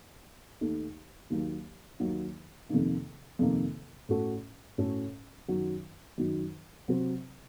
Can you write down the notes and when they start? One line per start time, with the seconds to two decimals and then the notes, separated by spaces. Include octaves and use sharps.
0.61 D#2 D#3 A3 D#4
1.30 D#2 D#3 F#3 A#3
2.00 D#2 D#3 F#3 A#3
2.69 F2 C3 D#3 A#3
3.39 F2 C3 D#3 A#3
4.09 A2 A3 C#4 F#4 A4
4.78 A2 A3 C#4 F#4 A4
5.48 F#2 D#3 F#3
6.18 F#2 D#3 F#3
6.88 C3 F#3 C4 F#4 C5